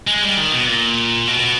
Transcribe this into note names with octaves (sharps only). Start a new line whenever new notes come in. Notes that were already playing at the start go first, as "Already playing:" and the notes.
G#3
G3
D#3
B2
A#2
B2